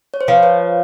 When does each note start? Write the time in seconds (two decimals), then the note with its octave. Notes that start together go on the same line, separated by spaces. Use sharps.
0.14 C#5
0.21 C5
0.28 F3 B4 C#5
0.43 B4 C#5